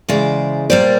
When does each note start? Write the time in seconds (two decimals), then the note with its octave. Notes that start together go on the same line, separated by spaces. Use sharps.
0.09 C#3 E3 G#3 C5 D5
0.70 A#2 G3 A#3 C5 D5